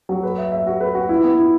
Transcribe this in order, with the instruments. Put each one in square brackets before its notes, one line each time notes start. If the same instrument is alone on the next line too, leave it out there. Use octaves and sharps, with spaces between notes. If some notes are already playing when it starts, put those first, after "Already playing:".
[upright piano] F#3
B4
E5
E5
F#4
B4
F#4
E4
B3
E4